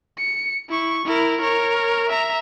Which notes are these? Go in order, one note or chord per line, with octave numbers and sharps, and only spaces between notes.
C#7
E4 C#6
E4 A#4
A#4 C#5
E5 A#5